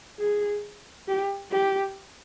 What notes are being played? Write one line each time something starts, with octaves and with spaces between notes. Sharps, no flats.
G#4
G4
G4